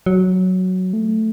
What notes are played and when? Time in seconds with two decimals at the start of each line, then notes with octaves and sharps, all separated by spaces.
0.06 F#3
0.93 A3